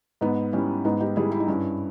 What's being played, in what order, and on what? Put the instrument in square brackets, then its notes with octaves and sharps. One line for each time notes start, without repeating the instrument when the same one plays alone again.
[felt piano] G#2 B3 D#4
G3 C#4 E4
G#2 B3 D#4
D#4 G4
G3 E4 G#4
E4 G#4
D#4
G2 C#4 E4